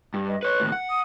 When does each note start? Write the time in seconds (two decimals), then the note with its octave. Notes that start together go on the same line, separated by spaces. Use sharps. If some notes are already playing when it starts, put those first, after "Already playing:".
0.14 G2
0.28 D#5
0.43 B4 C#5 F#6
0.60 D#2 A2
0.72 F#5
0.89 D#6